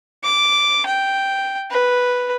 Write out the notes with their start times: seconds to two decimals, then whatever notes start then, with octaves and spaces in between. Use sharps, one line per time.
0.24 D6
0.86 G5
1.71 B4